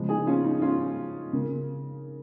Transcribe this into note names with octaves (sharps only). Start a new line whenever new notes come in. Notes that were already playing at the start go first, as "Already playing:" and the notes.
Already playing: C#3 F3 G#3
D#4 G#4
C#4 F4
D#4
C#4 F4
C#3 A#3